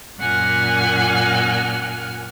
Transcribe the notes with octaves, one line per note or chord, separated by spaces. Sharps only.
F#2 A#2 F#5 G#5 F6